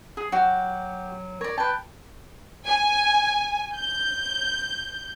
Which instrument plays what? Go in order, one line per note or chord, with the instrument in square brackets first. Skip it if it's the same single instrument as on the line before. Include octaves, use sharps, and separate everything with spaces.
[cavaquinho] G#4
[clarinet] F#3 [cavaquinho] F#4 G4
[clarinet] A#4 [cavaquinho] C#5 D5
[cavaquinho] B4 A5 [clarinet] G5
[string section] G#5
G6